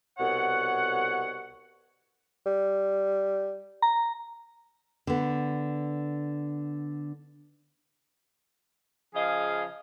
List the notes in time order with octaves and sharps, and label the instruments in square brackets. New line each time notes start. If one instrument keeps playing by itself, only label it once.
[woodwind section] C2 B2 C#5 F#5
[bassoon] G3
[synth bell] A#5
[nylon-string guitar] D3 B3
[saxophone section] C#3 F3 G#4 D#5 F5